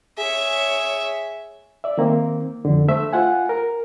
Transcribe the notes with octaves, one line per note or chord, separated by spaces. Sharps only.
G#4 C#5 E5
D5 E5
D#3 A#3 C4
F2 D3
A3 C5 E5
F4 F#5 G#5
A#4